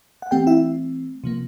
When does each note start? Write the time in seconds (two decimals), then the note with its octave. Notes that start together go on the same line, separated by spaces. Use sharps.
0.22 F#5
0.31 E3 A3 C4 G4 G5
0.47 E4 E5
1.24 C3 F3 A#3